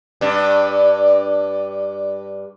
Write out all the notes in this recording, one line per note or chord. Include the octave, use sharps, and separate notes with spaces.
G2 D4